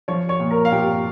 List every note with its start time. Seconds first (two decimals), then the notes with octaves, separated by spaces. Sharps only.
0.08 F3 C#5 C#6
0.29 C#5 C#6
0.40 A#2
0.51 A#4 A#5
0.65 F5
0.72 A#2 G4 G5